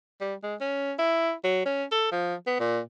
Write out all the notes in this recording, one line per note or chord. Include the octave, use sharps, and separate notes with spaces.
G3
G#3
C#4
E4
F#3
C#4
A4
F3
B3
A#2